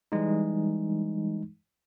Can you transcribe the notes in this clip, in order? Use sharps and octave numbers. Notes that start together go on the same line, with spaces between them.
E3 G3 G#3 D#4